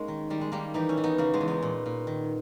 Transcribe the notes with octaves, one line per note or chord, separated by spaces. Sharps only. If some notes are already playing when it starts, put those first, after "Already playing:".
Already playing: G#3 A#3 C#4 D#4
D#3
D#3 G3
G#3
D#3 G3 A#3
E3 D#4 G4
C#4 E4
E3
B3 D#4
C#3 A#3 C#4
G#3 B3
E2
B3 D#4
A#2
A#2
D#3